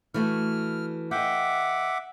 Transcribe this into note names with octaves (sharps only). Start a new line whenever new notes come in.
E3 A3 F#4 F6
D#5 E5 F#5 G5 D6